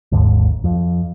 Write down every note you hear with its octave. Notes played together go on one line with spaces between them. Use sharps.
G#1 D#2 G#2 D3
F2